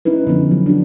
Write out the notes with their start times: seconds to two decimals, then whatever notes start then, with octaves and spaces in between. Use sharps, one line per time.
0.05 C#4 D#4 E4 B4
0.27 D3 F3 B3 C#4
0.51 F#3
0.66 D4 F#4